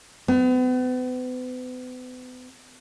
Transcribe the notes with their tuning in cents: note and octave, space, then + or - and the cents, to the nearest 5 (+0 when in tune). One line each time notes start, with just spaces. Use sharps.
B3 +40